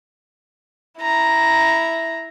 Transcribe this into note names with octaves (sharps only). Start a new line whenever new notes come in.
E4 A#5